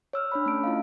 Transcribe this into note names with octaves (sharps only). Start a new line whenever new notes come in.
C#5 E6 F6
D4 C#5 B5
A3 C#4 D4 A5 D7
E4 F4 D#5 F5